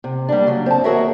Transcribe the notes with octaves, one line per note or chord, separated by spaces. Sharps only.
C3
G3 A#3 D4
C#3 F#3
C4 A5
D#2 F#4 G#4 A#4 C#5 E5